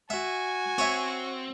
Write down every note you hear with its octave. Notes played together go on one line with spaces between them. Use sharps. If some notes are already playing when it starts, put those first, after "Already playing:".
F#4 E5 G#5
C4 C#5 E5